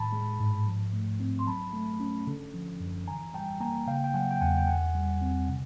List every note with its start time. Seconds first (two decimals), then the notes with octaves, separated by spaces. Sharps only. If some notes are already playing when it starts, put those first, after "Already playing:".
Already playing: A2 D#3 A5 B5
0.12 G#3
0.39 G#2
0.66 F3
0.93 A3
1.20 C4
1.39 C6
1.47 F#3 A5 B5
1.73 A3
2.00 C#4
2.27 D3
2.54 F3
2.80 F#2
3.07 E3 G#5 A#5
3.34 G3 G5 A5
3.60 A#3 G#5 A#5
3.87 C#3 F5 G5
4.04 G5
4.14 F#3 F#5 G#5
4.31 G5
4.41 E2 F#5 G#5
4.58 G5
4.67 D3 F#5 G#5
4.95 G3
5.21 C4
5.48 C3